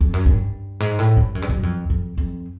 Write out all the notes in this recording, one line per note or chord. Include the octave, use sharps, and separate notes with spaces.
F2
F#2
G2
G#2
A2
G2
F#2
G2
F#2
F2
F2
F2